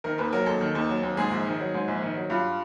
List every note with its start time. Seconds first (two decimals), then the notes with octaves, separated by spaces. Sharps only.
0.04 D#3 A#4
0.18 D#2 B4
0.32 F#3 A#4
0.46 D#2 A4
0.61 D#3
0.75 D#2
0.89 F#3
1.03 D#2
1.17 G#2 G#4
1.31 A#1
1.46 D#3
1.60 F#3
1.74 G#2
1.88 A#1
2.02 D#3
2.16 F#3
2.30 G2 F4